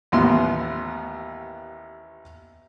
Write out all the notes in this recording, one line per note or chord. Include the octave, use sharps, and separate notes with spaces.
A1 D#2 B3 C6